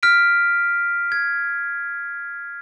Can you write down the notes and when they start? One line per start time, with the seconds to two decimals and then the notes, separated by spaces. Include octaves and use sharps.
0.03 F6 B6 D7
1.12 G#6